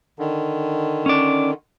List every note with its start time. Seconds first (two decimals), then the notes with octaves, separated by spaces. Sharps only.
0.19 D3 D#3
1.06 C#4 D5